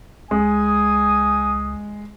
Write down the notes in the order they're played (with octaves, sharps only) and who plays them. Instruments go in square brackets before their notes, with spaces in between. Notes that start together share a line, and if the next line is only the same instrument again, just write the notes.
[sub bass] C#2 [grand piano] G#3 [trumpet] G#5 [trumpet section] D#6